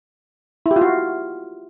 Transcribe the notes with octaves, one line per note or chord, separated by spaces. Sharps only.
E4
G4
F4
F#4